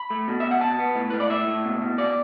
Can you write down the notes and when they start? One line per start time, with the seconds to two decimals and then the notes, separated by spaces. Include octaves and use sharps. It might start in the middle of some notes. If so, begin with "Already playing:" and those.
Already playing: B5
0.10 A3
0.28 B2
0.40 B2 E5
0.51 F#5
0.61 B2 A5
0.79 B3
0.95 A2
1.10 A2 B4
1.20 D5
1.30 A2 E5
1.47 A2
1.65 B2
1.82 B2
1.98 B2 D5